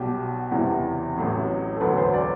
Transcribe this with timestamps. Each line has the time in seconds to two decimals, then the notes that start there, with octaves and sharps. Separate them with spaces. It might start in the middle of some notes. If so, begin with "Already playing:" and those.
Already playing: B1 B2 G3 G4
0.51 F#1 E2 C3 E3 G3
1.16 A1 A2 F#3
1.76 A4
1.81 E1 D2 D3 F#3 B4
1.97 C5
2.14 D5